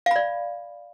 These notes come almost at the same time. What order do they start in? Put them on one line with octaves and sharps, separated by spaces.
F5 B5 D5